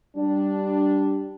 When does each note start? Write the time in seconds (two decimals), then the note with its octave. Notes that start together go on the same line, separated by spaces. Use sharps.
0.17 G3 D4